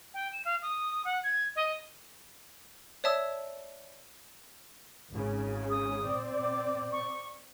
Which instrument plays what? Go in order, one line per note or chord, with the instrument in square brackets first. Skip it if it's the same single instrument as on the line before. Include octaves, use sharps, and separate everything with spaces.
[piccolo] G5
E7
F5
D#6
F#5
G#6
D#5
[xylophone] C#5 D5 E5 A5 D#6 E6
[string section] G#1 C#3
[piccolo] D#6
[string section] C4 D5
[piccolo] D6
C#6